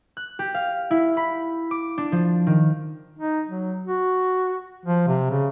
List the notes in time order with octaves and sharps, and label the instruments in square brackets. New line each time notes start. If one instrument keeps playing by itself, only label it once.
[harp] F#6
G4
F5
E4
B5
D6
D4
F3
D#3
[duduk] D#4
F#3
F#4
F3
C3
C#3